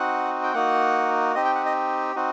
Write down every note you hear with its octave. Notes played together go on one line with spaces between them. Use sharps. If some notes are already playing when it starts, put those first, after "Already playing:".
Already playing: C4 D#4 F#4 F#5
G5
A#3 D#4 F#4 F#5
C4 D#4 G4 D#5
G5
F#5
D#5
C4 D#4 F#4